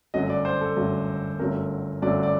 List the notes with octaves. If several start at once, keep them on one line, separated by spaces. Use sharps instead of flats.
G1 F#2 F#3 A3 D#5
D5
C5
A4
G1 F#2 F#3 A3
G1 F#2 F#3 A3 A#4
G1 F#2 F#3 A3 D5
D5